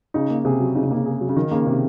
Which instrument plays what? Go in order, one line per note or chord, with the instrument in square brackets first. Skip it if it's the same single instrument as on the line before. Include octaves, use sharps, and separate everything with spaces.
[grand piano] C#3 [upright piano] D#4
[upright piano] A#3
[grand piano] C3 [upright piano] G#4
[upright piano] F#3
[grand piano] C#3 [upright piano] D#4
[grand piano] C3
[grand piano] C#3 [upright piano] A#3
[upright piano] G#4
F#3
[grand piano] C#3
[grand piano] D#3 [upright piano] D#4
[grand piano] C#3 [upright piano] A#3
[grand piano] C3 [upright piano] G#4